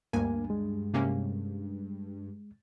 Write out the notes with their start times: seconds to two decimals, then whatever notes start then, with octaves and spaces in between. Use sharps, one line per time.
0.13 D2 G2 A#3 G#5
0.50 G#3
0.94 C3 A#3 C#4